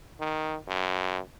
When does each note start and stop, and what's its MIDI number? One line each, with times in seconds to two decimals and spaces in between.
0.20 0.56 51
0.68 1.20 42